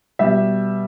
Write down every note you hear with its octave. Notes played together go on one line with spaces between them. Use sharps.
B2 G3 E5